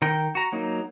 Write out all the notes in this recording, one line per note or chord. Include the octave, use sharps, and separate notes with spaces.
D#3 A#4 G5
F#4 A#5
F#3 A#3 D#4